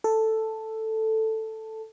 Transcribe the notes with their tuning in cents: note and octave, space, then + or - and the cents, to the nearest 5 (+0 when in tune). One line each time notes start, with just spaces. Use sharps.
A4 +5